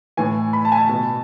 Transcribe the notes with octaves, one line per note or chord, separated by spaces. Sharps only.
A2 E3 G#5
B5
A5
G#5
A5
B2